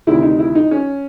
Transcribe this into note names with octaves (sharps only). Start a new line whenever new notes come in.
D2 C3 D#3 E4
D#4
E4
D#4
C#4